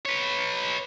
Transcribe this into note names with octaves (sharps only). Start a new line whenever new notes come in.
B4 C#5